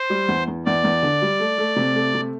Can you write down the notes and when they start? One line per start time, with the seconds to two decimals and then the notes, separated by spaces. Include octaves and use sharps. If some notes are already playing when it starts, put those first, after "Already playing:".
Already playing: C5
0.10 G3
0.28 E2
0.48 E2
0.66 E2 D5
0.84 E2
1.03 D3
1.22 G3
1.40 A3
1.58 A3
1.76 C3
1.95 A3
2.14 C3